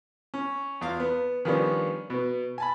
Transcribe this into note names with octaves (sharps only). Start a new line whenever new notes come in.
C#4
E2 F4 F5
B3
D#3 F3 G3 B3 C#4 D4
B2 B3
G#5 A5 B5